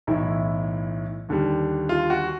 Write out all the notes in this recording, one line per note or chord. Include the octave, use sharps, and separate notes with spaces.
B1 A2 E3 E4
D#2 D3 G3
F4
F#4